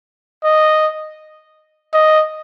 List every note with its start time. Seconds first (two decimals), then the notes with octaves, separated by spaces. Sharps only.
0.44 D#5
1.94 D#5